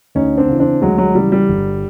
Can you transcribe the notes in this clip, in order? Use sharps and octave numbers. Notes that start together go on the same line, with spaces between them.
D2 C#4 D#4
C4 D4
C#3 E3
C4 D4
D2 F#3 G#3
F#3 G#3
C#3 E3 G3
G3
G1